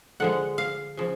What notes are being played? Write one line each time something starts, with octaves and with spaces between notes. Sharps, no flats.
D3 F3 G#3 F#5
F5
C#3 F3